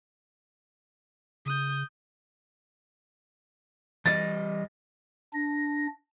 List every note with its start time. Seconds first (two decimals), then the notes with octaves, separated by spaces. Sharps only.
1.46 C#3 D#6 G6
4.06 E3 G3 D#5 A6
5.33 D4 A#6